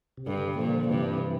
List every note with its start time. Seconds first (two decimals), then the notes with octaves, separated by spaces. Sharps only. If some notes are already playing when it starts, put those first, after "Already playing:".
0.17 C3
0.27 G2 D3
0.58 A#2 D3 F3
0.89 G2 C3 E3